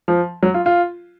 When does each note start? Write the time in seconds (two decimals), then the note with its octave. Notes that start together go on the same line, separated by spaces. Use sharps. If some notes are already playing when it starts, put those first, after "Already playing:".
0.08 F3
0.43 F#3
0.54 F4
0.66 F4